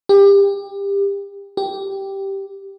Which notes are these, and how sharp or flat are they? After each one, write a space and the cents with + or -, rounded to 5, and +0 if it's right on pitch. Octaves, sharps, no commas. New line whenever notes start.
G4 +25
G4 -5